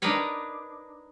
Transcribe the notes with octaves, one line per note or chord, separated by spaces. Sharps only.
D4 D#4 A#4 B4 C#5